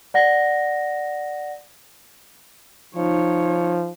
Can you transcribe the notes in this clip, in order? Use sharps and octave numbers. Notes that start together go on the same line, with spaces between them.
D5 F#5 A#6
F3 D#4 C#5